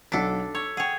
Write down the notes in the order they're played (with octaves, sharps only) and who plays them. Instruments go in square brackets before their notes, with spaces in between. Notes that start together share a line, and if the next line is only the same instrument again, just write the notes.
[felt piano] B1 F#5 B6 [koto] D4 A4
[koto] C#5 [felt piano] E6
[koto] G#4 C#5 [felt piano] F#5 G5